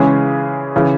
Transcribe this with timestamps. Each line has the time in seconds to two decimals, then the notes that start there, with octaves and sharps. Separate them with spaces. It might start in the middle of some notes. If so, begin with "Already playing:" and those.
Already playing: C#3 E3 G#3 C#4 G#4
0.76 C#3 E3